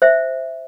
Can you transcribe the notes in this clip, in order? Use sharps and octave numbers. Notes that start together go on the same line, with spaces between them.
C5 E5